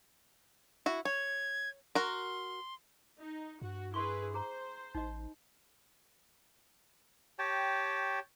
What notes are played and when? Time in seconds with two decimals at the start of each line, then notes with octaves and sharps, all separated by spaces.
0.86 E4 F#4
1.05 C#5 G#6
1.95 F#4 A#4 C6
3.21 D#4
3.62 G2 F#4
3.94 E4 G#4 B4 C6 C#6
4.34 G#4 C5 A#5
4.95 A1 D#4 D#5
7.39 G4 C#5 G5 A5